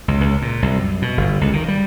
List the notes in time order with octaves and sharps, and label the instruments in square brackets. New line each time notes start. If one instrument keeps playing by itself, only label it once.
[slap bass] C#2
C#2
A#2
C2
F#2
B2
G1
C#2
D#3
G3